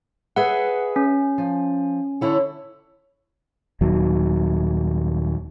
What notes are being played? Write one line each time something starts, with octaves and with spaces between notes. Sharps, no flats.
G#4 B4 E5 F#5
C#4
F3
D3 E4 C#5
D#1 D#2 D#3 F#3